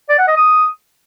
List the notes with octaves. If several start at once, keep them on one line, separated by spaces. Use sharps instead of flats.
D5
F#5
D#5
D#6